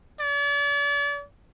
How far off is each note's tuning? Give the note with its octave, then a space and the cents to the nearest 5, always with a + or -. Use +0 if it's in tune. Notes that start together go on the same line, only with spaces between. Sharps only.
D5 -40